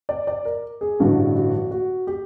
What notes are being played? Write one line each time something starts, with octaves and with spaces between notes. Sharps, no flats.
D5
D5
A#4
G#4
A1 G2 D3 F#4
F#4
F#4
G4